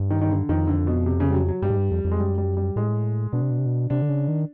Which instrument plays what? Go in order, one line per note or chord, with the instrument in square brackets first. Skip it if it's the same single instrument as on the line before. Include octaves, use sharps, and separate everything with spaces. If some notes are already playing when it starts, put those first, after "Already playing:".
Already playing: [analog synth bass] G2
[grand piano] D#3
D#3
D3
[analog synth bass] F2 [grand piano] D#3
[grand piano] D3
B2
C3
C#3
G3
F#3
F#3
[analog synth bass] G2 [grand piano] G3
[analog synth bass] G#2
G2
F2
F2
[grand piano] G#3
[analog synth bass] F#2 [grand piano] G3
[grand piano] G3
G3
[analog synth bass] A2 [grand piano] G#3
[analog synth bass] B2 [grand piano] D4
[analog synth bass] C3
B2
C3
B2
[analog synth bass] C3 [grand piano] D4
[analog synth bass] D3
C#3
D#3